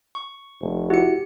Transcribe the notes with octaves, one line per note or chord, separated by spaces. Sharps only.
C#6
F1
E4 F#4 G4 C#7